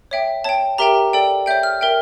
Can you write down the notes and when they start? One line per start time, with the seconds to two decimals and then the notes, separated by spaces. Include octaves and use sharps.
0.11 C#5 E5 G5
0.44 C#5 G5 A5
0.78 G4 A#4 E5 G5 A#5
1.13 A4 D5 G5
1.46 C#5 E5 G5 G6
1.63 F6
1.81 A#4 E5 G5